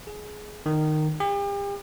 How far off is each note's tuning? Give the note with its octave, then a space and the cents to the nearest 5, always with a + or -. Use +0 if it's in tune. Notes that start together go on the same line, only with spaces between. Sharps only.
G#4 +15
D#3 -15
G4 +40